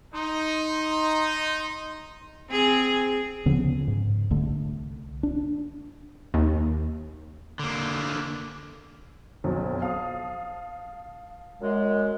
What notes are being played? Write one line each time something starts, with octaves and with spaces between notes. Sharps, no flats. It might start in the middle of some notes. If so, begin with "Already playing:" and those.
D#4 C6
C4 G#4
D2 C#3 F3 B3
G#2
C2 D3 A3
D4
D#2
D3 A#3
B1 F2 F#3
F5 A5 D#6
F#2 G#3